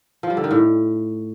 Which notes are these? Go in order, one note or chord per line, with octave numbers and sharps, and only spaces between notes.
F3
G3
D3
D#3
A2